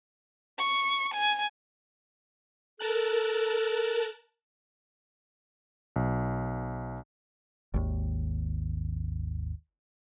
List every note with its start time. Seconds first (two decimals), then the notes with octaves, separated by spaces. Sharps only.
0.58 C#6
1.14 G#5
2.79 A4 A#4 A5 F#6
5.96 B1
7.74 G#1 D#2